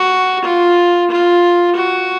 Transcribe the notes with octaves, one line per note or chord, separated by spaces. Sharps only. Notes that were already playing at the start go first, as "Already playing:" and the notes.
Already playing: F#4
F4
F4
F#4